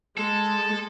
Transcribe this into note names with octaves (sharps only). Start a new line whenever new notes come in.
G#3 A4